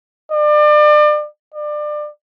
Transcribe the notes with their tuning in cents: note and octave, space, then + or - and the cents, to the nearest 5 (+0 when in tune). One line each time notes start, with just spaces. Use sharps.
D5 +35
D5 +25